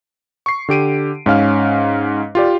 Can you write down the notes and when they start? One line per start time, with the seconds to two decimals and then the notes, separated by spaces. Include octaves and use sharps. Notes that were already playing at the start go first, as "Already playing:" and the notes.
0.46 C#6 C7
0.69 D3 G4 D7 D#7
1.26 G#2 C#4 F5 F6
2.35 F4 G4 D5